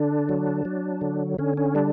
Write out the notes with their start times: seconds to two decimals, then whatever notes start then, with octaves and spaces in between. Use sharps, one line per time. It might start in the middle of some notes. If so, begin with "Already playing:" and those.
Already playing: D3 D4
0.29 F#3
0.65 F#3
1.01 D3
1.39 D3 C#4
1.57 C#4
1.75 G3 D4